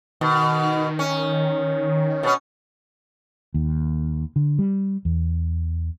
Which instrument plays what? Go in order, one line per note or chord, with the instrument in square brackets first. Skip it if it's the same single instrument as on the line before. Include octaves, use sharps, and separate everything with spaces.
[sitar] B2 [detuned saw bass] D#3
[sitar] C#4
B2 C#4
[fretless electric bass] D#2
D3
G3
E2